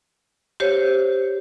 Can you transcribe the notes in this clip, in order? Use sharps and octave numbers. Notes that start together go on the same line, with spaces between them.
G4 C5 C#5